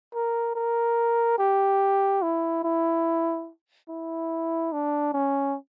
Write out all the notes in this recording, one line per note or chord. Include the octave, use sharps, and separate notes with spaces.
A#4
A#4
G4
E4
E4
E4
D4
C#4